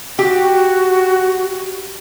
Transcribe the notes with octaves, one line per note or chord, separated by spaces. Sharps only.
F#4 G4